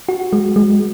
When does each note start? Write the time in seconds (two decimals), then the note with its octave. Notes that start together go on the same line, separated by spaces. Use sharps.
0.09 F#4
0.33 G#3
0.56 G#3